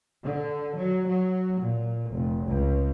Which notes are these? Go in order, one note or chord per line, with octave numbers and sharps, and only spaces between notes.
D3
F#3
F#3
A#2
F1
C#2